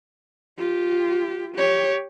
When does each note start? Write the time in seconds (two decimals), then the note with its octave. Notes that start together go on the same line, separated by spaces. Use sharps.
0.58 F4 G4
1.55 G4 C#5